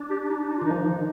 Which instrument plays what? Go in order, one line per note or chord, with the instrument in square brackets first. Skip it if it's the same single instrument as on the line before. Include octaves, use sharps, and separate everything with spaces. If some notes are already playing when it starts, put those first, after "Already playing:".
Already playing: [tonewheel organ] D4
[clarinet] G4
D#4
D#4
F4
[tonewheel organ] D#3 [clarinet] D#4
[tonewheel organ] F3
D#3